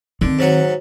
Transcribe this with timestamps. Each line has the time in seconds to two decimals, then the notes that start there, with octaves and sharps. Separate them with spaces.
0.21 D3 D#3 C4
0.39 G#2 F#3 F#5